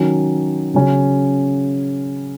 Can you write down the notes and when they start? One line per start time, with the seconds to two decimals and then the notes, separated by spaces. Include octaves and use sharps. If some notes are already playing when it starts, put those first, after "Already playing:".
Already playing: D#3 F#3 C#4
0.74 C#3 F#3 C#4